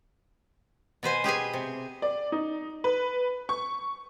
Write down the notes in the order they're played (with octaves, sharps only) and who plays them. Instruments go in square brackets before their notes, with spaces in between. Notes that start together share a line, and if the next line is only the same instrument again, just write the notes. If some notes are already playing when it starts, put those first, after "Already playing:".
[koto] B2 B4 C5 G#5
G4 G#4 B4 G#5
C3
[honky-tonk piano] D5
D#4
B4
C#6